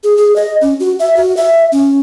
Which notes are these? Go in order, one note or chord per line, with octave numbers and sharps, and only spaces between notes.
G#4
G#4
D#5
C#4
F#4
E5
F#4
E5
C#4